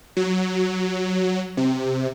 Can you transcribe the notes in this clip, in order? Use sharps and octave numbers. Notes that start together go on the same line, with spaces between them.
F#3
C3